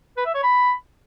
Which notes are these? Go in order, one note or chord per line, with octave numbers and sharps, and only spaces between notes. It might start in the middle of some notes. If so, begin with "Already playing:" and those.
B4
E5
C#5
B5